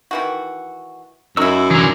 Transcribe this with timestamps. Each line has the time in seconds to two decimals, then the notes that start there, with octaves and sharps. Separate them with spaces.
0.11 D#3 E3 F#4
1.37 F#2 D#4 E4 F#4 C#6 E6
1.71 E3 D4 G#4 A#5